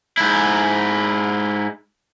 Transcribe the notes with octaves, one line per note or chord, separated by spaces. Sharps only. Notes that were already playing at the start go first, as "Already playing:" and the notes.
G#2 E4